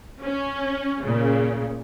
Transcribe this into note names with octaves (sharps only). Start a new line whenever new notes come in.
C#4
A#2 C#3